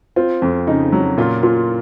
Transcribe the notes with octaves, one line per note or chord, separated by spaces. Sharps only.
C4 F4
F2
C#3 D#4
F#3
A#2 F4
A#2 F4